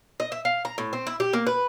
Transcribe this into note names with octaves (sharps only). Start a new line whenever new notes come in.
D#5
E5
F5
A#5
A2
C4
E4
G4
A#3
B4